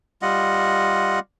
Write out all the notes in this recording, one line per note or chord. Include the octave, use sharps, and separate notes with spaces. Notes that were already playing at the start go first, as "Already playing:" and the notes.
G3 F4 D#5 F#5